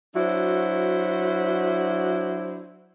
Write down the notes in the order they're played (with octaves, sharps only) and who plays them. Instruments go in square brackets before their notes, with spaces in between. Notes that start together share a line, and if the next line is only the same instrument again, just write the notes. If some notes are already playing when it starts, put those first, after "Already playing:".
[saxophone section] F#3 D4 E4 F#4 C5